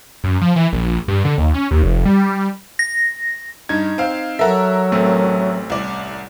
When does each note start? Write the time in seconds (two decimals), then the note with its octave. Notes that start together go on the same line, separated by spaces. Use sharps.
0.24 F#2
0.41 F3
0.56 E3
0.73 A#1
1.08 G2
1.25 D3
1.38 D#2
1.54 C#4
1.71 D#2
1.83 F1
2.05 G3
2.79 A#6
3.69 G2 D#4 G#6
3.98 C4 F5
4.39 F#3 A4 A#4 E5 F#5 A#5
4.92 A1 A3 C4
5.70 C2 D5